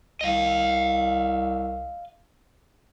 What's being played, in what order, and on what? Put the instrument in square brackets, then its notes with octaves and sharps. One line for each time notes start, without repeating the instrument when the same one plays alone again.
[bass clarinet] C2 [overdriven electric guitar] D#5 F5